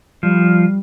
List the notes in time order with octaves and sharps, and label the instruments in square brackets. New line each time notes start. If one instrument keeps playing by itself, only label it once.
[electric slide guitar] F3 [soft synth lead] G3